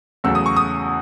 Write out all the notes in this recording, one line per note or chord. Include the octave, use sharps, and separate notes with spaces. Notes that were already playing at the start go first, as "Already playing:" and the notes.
E2 C#3 F#3 A3 E6
D#6
C#6
D#6